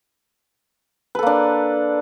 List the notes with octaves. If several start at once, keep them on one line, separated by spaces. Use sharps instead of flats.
A#3 D4 A4 B4